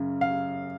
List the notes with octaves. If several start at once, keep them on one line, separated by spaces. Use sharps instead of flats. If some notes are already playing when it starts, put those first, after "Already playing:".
Already playing: F#2 C#3
F5